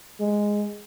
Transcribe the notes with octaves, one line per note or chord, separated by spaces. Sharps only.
G#3